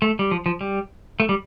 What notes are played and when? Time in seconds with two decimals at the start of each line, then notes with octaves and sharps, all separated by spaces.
0.02 A3
0.19 G3
0.31 F3
0.46 F3
0.61 G3
1.20 A3
1.29 G3